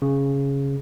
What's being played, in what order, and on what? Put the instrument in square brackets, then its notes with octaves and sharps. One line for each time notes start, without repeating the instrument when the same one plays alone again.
[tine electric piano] C#3